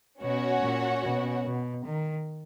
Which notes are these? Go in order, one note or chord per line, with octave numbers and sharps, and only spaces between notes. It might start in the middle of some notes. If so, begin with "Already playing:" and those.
B2 C#4 F#4 C#5 F#5
A#2
B2
B2
D#3